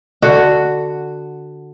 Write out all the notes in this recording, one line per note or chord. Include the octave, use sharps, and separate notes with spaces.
D3 F#4